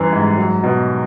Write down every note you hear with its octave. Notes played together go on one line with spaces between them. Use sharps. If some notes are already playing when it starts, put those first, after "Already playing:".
Already playing: F#2 E3 G3
G#2
F#3
B2